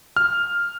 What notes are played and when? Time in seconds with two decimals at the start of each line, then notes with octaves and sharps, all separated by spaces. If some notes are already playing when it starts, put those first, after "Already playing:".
0.16 F6